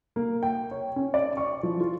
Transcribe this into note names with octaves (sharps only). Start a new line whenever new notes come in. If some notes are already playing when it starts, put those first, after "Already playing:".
A#3
G5
C#5
C#4
D5
C#6
F3
F4